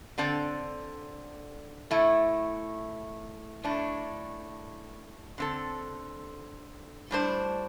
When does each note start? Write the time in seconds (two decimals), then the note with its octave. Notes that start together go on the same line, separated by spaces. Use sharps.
0.18 D3 C4 A4 D5
1.91 A2 A3 E4
3.64 A2 A3 D4
5.38 D3 C4 A4
7.11 A2 G3 D4 C5